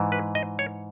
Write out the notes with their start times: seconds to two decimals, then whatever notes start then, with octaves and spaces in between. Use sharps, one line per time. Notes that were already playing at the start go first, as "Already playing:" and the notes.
Already playing: G#2 E3
0.12 B4
0.35 D#5
0.59 C#5